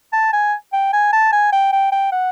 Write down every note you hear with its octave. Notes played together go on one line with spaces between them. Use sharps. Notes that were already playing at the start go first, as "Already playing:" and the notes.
A5
G#5
G5
G#5
A5
G#5
G5
G5
G5
F#5